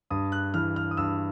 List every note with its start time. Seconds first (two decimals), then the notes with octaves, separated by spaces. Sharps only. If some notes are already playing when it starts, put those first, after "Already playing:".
0.11 G2 D#6
0.32 F#6
0.54 E3 F6
0.76 F6
0.91 D#6
0.97 G2 E6